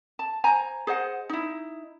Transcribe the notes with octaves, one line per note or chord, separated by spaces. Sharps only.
A5
C5 G#5 A#5
G#4 C5 D#5 F#5
D#4 E4